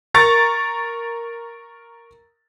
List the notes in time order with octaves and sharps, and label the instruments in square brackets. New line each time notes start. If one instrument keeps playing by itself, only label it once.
[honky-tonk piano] A#4 A#5 C#6 A6